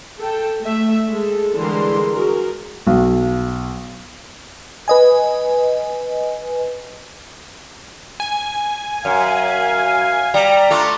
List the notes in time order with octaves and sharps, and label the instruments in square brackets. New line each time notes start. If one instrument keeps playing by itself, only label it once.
[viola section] A4 G5
A3 E5
G#3 A4
D3 E3 G3 G#3 A#4 C6
F#4 G#4 A#4
[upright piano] B1
[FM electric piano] B4 D#5 G#5
[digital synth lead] G#5
[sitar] F#2 [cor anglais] F5
[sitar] G3 [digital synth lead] A#5
[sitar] A3 F4 [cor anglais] D4